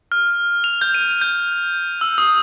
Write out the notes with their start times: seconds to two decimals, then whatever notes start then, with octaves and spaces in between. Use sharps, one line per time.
0.12 F6
0.64 F7
0.81 G6
0.94 D#7
1.21 G6
2.01 E6
2.18 D#6